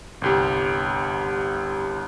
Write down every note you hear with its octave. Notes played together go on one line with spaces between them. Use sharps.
G1 C2 G4